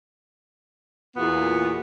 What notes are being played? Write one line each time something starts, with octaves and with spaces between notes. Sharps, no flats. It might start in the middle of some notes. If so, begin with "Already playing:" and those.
E2 A#2 A#3 B3 F4 F#4